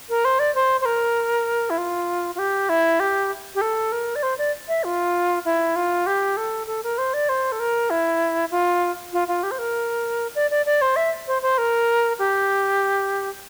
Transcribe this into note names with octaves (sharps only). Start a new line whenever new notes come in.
A#4
C5
D5
C5
C5
A#4
E4
F4
F4
G4
E4
G4
G4
A4
A#4
D5
C5
D5
E5
F4
E4
F4
G4
A4
A4
A#4
C5
D5
C5
A4
A#4
E4
F4
F4
F4
G4
C5
A#4
D5
D5
D5
C5
E5
C5
C5
A#4
G4